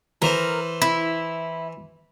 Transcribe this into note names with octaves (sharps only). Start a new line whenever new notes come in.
E3 A#4 C5
E4